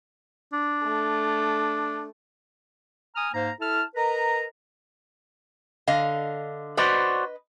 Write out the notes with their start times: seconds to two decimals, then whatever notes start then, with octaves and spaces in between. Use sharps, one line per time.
0.53 D4
0.83 A3
3.15 G#5 A#5 D#6 F6
3.33 G#2 A#3 C5 F5 A#5
3.60 E4 A4 A5 F6
3.95 A#4 B4 D#5 A#5
5.87 D3 D#5 F5
6.77 F#4 B4 C5 D5 D#5